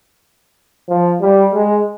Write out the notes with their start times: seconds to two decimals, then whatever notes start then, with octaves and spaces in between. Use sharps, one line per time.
0.89 F3
1.21 G3
1.54 G#3